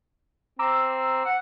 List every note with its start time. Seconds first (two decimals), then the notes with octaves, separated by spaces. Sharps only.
0.59 C4 A#5 D6 E6
1.25 F#5